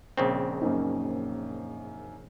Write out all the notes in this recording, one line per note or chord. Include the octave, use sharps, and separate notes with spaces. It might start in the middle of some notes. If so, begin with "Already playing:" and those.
A#1 C#3 C4
F#2 A#3 D#4